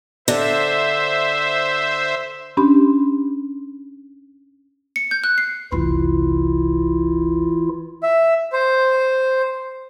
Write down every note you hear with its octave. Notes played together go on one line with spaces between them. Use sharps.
D3 C5 E5
C#4 D4 G4 B5 C6
C#7
G6
F#6
C7
F1 C2 E3 E4 F4
E5
C5